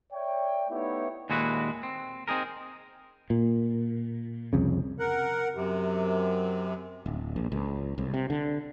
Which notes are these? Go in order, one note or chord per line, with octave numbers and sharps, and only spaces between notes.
C#5 D5 E5 G5
A3 B3 D#4 E4 G4 C#5
D#2 A#2 G#3 E4 F#4 B4
C4
C4 D#4 G#4 A#4
A#2
C2 F2 C#3
A#4 F#5
F#2 C3
D1
A#1
C#2
C2
C3
D3